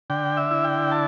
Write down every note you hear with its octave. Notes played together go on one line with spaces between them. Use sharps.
D3 G5
E5
E4
G5
A5